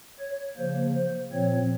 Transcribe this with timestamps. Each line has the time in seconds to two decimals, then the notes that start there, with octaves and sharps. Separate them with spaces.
0.20 C#5
0.57 C#3 F3 A#3 C5
0.94 C5
1.32 A#2 F3 C4 C#5